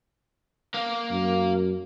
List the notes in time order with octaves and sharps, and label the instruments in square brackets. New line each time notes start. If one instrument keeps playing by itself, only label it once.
[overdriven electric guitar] A#3 A#4
[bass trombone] F#2